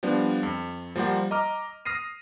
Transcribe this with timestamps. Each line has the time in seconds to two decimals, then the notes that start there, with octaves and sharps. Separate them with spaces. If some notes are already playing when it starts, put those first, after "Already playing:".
0.03 F3 G3 B3 D4
0.43 F2
0.96 F3 G3 A#3 C5 F#5
1.31 D#5 A#5 D6 F6
1.85 D#6 F6 A#6 C7 D#7